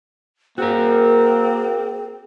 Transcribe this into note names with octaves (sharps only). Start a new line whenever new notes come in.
A#3 C4 F#4 G#4 A#4